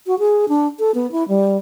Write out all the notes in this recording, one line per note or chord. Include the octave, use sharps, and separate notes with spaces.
F#4
G#4
D4
A4
B3
E4
G3